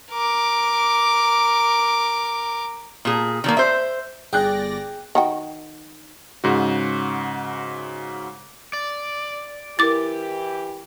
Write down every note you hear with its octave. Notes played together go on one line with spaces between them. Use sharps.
A#4 D6
A#2 G#4
D#3 F#3 A#3
C5 E5
G1 G#4 D5 G5 F#6 A#6
D#3 F#4 G5
G#2 C#3 F#4
D5
E3 E4 G4 A#4 D6 A6